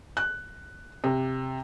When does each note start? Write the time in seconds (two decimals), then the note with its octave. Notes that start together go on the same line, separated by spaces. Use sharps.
0.17 F#6
1.04 C3